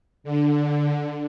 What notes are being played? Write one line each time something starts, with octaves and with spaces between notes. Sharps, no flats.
D3